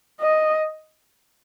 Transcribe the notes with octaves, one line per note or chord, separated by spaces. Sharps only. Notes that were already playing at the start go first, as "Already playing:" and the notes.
D#5